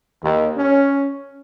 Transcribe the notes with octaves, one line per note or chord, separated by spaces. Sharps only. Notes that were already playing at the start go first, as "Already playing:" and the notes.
D#2
C#4